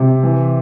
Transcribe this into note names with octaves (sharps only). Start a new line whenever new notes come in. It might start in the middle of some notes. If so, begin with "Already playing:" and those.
Already playing: C3
E3